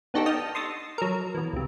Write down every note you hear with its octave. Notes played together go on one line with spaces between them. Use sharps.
B3 D4 D#4 F#4 G4 A4
D#5 A5 D#6 F6 G6
C6 C#6 D#6 E6 A6 A#6
F#3 A4 A#4
B2 E3
C#2 C3